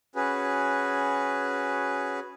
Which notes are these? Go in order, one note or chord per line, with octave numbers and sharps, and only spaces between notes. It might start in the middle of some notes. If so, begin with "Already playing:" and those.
C#4 F#4 G#4 B4